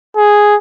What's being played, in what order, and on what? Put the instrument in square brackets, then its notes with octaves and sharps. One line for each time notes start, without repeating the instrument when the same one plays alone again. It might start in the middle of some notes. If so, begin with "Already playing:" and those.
[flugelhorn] G#4